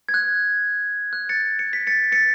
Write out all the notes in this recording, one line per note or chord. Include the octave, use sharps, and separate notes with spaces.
G#6
F#6
F#6
A6 C#7
C#7
B6
A6 C#7
A6 C#7